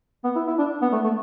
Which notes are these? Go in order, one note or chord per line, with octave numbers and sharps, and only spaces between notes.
B3
E4
E4
D4
B3
A3
A3